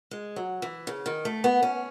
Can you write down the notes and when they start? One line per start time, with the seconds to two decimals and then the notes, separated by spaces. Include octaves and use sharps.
0.11 G#3
0.36 F#3
0.62 E3
0.87 C#3
1.06 D#3
1.25 A3
1.44 B3
1.63 C#4